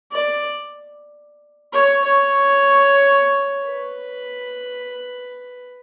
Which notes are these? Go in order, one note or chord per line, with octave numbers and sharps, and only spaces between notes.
D5
C#5
C#5
B4